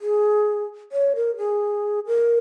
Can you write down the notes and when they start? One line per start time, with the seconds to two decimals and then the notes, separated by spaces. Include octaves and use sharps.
0.01 G#4
0.92 C#5
1.16 A#4
1.38 G#4
2.07 A#4